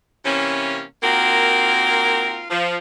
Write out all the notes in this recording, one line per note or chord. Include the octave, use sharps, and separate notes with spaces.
C3 E3 A#3 C#4
A#3 C4 D#4 F4 F#4 A#4
F3